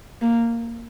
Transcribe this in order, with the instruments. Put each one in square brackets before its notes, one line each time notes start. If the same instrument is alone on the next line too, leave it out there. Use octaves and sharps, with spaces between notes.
[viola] A#3